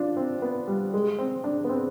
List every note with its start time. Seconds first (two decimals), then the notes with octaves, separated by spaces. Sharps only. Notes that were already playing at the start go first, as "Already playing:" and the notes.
Already playing: D4 F4
0.17 C4
0.42 B3
0.68 G3
0.94 G#3
1.19 C4
1.44 D4
1.64 B3
1.69 C4